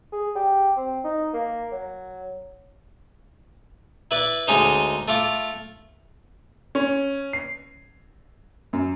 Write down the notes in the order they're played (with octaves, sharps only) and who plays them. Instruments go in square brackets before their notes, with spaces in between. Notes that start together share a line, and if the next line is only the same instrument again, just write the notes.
[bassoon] G#4
G4
C4
D#4
A#3
F#3
[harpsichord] E4 B4 D5
D2 G#3 C#4 D#4 C5
A3 F4 D6
[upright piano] C#4
C7
F#2